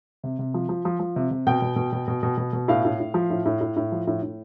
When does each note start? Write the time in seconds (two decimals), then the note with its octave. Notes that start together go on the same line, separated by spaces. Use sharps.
0.23 C3
0.39 C3
0.54 F3
0.69 F3
0.85 F3
1.00 F3
1.16 C3
1.31 C3
1.47 B2 G5
1.62 B2
1.76 B2
1.93 B2
2.08 B2
2.23 B2
2.37 B2
2.53 B2
2.68 A2 F5
2.85 A2
3.00 A2
3.14 F3
3.30 A2
3.46 A2
3.61 A2
3.76 A2
3.92 F3
4.07 A2
4.22 A2